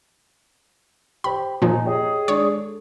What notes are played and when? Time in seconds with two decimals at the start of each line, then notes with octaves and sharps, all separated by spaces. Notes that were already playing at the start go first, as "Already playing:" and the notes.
1.24 G4 C5 B5
1.62 A#2 F3 D#4 D#5 G#5
1.85 G4 G#4 C#5 D#5
2.28 G#3 D4 C#5
2.44 A4